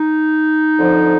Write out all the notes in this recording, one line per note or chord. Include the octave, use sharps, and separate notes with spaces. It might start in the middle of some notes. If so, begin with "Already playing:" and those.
Already playing: D#4
F2 D3 F3